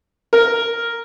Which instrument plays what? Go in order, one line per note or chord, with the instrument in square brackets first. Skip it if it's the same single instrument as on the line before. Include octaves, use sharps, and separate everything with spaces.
[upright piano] A#4